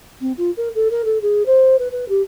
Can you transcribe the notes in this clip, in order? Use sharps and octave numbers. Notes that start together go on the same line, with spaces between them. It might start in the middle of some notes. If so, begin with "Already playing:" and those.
C4
F4
A#4
A4
A#4
A4
G#4
C5
B4
B4
G4